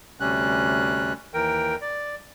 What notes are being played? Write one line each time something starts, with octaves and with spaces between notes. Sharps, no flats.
D2 C3 G3 C#4 F#6
D#2 E3 A#4 G5
D5